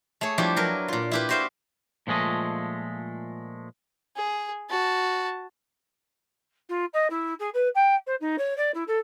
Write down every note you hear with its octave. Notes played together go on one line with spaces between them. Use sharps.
A3 G#4 C#5
F3 G3 D4 E4 G4
F#3 A#4 B4
A#2 F4
E4 G4 B4
F#4 G4 C5 E5 F5
A#2 F3 G#3 A3 D#5
G#4
F#4 A5
F4
D#5
E4
G#4
B4
G5
C5
D#4
C#5
D5
E4
A4